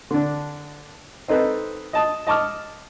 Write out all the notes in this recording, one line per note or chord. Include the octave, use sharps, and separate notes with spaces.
D3 D4
C4 D#4 A4 B4 C5
D#5 A5 D#6
D#5 A5 C#6 D6 F6